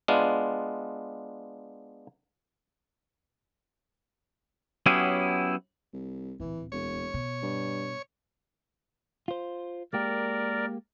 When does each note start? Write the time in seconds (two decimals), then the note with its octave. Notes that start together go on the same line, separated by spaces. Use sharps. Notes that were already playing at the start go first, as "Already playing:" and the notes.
0.08 G#3 B3 D4 F4
4.86 F#3 B3 C#4 E4 G4 G#4
5.93 C2
6.40 D1 A#2 E3
6.72 E1 C#5
7.14 B2
7.42 G2
9.28 F4 C5
9.93 G#3 A#3 G4 A#4 D5